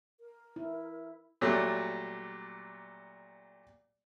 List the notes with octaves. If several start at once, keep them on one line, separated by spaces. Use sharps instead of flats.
A#4
E4
A#2 F#3 G3 A3